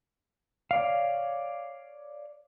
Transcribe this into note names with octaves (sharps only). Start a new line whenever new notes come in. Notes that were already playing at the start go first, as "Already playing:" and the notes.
C#5 D5 F5